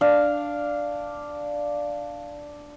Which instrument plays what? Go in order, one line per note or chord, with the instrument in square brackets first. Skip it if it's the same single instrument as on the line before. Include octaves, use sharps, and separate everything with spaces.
[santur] D4 F5